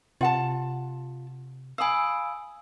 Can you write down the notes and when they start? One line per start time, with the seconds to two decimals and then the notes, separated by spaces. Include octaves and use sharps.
0.21 C3 F4 F#5 A5
1.78 F5 G#5 B5 D#6 E6